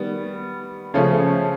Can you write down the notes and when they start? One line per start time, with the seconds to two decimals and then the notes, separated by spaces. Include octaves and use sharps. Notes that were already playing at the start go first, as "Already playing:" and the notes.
Already playing: D#3 G3 B3
0.94 C#3 F3 A3 C#4